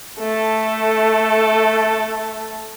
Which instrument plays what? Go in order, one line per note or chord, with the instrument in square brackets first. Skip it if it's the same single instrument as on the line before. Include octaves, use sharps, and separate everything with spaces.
[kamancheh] A3 A4